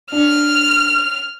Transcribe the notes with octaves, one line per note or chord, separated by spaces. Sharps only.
D4 F6